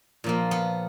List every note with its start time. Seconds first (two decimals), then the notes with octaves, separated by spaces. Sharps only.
0.24 A#2 F3 A#3
0.51 B3